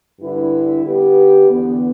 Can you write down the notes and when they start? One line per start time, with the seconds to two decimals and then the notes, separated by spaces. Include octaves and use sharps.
0.20 G2 D3 G3 E4 B4
0.85 D3 B3 G4
1.49 E2 D3 B3